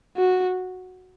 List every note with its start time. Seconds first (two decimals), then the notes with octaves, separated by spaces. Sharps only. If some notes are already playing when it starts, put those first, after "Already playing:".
0.17 F#4